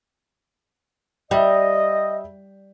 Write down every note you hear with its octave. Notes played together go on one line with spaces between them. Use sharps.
G3 D#5 E5 G5